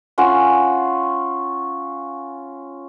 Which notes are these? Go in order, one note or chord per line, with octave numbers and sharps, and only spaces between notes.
C#4 F4 F#5 G#5